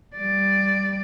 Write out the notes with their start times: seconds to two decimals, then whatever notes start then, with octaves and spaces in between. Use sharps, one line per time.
0.17 G3 D5